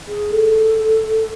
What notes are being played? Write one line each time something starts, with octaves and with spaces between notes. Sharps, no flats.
G#4
A4